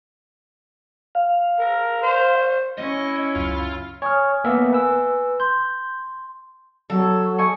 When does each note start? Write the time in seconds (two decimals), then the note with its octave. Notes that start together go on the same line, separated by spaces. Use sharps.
1.15 F5
1.59 A#4
2.02 C5
2.78 C#4 E4 D#5
3.35 C#2 F#2 F4
4.02 C#5 G#5 D#6 F6
4.44 A#3 B3 E5
4.73 B4 G#5 E6
5.40 C6 G6
6.90 F#3 A4
7.38 D#5 G#5 C#6